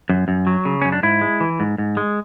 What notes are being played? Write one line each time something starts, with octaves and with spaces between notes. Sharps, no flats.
F#2
F#2
F#3
C#3
F#2 C#4
D4
G#2 E4
G#3
E3
G#2
G#2
G#3